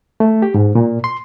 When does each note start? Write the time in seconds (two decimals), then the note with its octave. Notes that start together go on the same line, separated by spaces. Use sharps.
0.20 A3
0.42 G4
0.54 G#2
0.75 A#2
1.04 C6